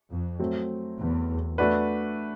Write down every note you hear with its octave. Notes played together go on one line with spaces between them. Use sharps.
F2
F#3 A3 C4
E2
A3 D4 F#4 B4